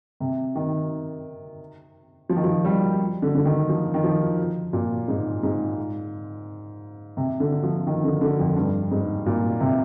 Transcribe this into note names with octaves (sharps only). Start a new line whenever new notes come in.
C3
D#3
F3
D#3
F3
G3
D3
D3
D#3
F3
D#3
F3
A#2
G#2
G#2
C3
D3
F3
D#3
D3
D3
F2
G2
G#2
A#2
C3